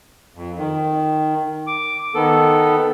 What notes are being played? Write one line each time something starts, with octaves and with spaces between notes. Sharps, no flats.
F2
D#3
D6
D#3 B3 A4